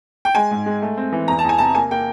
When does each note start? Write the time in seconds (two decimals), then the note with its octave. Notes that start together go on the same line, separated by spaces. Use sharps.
0.25 G5
0.35 G#3 G#5
0.51 G#2
0.66 G#3
0.82 A3
0.97 C4
1.12 E3
1.28 E2 A#5
1.39 A5
1.45 E2 G#5
1.58 C3 A5
1.75 A#3 G#5
1.91 A#3 G5